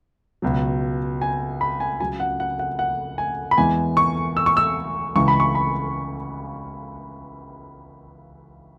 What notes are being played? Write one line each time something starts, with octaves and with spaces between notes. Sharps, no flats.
C#2 B2 F#3
G#5
B5
G#5
C#2 C#3 F#3 G#5
F#5
F#5
F#5
F#5
G#5
B5
E2 E3 G#3 G#5
C#6
E6
C#6
E6
C#2 C#3 E3 G#3 C#6
B5
C#6
B5